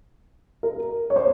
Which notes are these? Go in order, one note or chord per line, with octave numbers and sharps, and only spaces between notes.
A#4
C#5
C5